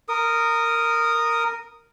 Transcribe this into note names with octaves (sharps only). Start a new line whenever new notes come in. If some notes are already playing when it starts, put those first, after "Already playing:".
A#4 D#6